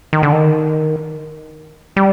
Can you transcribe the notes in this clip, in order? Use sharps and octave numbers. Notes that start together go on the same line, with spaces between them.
D#3
D3
D#3
G3